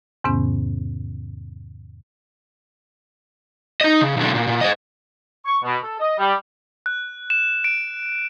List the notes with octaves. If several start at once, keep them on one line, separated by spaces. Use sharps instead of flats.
E2 G#2 C3 D#3 B3 C#4
D#4 D#5
C#3
B1 D3
A#2
A#2
C5 D#5
C#6
B2
A4
D#5
G3
F#6
E7
D7